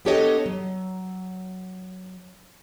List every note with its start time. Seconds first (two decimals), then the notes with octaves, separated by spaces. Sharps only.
0.05 B3 D4 G4 A4 C#5 D#5
0.46 F#3